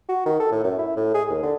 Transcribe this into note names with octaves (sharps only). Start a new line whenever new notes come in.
F#4
D#3
A4
A2
F#2
E4
A2
G#4
D#2
D3